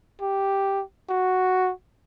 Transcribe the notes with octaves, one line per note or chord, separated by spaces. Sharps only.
G4
F#4